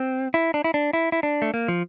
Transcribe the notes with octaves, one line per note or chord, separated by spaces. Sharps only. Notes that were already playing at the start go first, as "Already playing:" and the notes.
Already playing: C4
E4
D4
E4
D4
E4
E4
D4
A3
A#3
F3